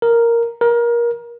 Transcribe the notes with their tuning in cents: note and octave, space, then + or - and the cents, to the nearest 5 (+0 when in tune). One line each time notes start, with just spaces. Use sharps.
A#4 +0
A#4 +25